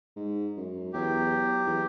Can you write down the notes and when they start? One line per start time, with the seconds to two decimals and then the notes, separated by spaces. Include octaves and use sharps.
0.16 G#2
0.56 F#2
0.93 E2 F#3 G4
1.67 E2